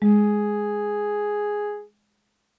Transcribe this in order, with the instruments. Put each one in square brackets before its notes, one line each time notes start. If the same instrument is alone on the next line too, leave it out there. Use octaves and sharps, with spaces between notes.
[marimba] G#3 [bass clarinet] G#4